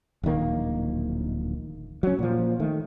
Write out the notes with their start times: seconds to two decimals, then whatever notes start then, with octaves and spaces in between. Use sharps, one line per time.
0.23 D1 A#1 D#3 A#3
2.03 F#3 C#4
2.19 A#2 F3
2.60 D#3 A3